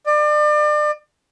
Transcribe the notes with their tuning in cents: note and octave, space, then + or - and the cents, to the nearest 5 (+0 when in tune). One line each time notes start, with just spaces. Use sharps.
D5 +35